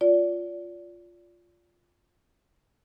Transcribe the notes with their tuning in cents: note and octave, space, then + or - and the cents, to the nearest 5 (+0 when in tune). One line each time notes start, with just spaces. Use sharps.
F4 +0 D5 -25